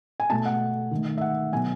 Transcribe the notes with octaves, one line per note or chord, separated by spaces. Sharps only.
G#5
B2 A3 A5
F#5
D#3 A3
E5
F#5
B2 F#3 B3 G#5